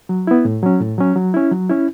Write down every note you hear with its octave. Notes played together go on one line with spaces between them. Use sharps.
F#3
B3 E4
A2
F#3 C#4
A2
F#3 C#4
F#3
C#4 E4
F#3
C#4 E4